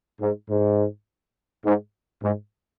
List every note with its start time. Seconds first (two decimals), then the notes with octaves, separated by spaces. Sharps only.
0.21 G#2
0.49 G#2
1.64 G#2
2.23 G#2